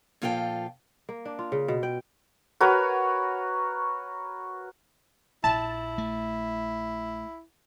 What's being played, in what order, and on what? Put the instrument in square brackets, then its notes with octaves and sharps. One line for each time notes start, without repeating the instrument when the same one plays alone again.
[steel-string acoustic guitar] A#2 F3 F4 A4 F5 G5
[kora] A#3
D4
F4
C#3
B2
G5
[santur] F#4 A#4 B4 C#5
[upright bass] A#1 [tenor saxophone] E4 [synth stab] A5
[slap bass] A3